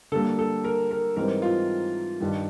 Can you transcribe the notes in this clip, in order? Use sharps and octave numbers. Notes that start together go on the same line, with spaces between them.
D3 G3 A#3 A4
A4
A#4
A#4
G#2 E3 G3 C4 A#4
F4
G2 D#3 G3